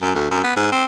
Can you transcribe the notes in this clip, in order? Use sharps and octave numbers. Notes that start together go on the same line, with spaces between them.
F#2
D2
F#2
B3
G#2
C4